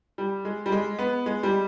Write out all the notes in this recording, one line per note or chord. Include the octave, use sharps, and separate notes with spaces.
G3
G#3
G3
G#3
B3
G#3
G3